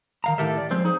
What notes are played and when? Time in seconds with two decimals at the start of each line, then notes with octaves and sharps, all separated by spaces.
0.24 D#3 F5 A#5
0.38 A2 D#3 G4 A4 A#4 E5
0.58 D5
0.71 F3 G#3 C4 C5
0.85 D#4 G#4 C5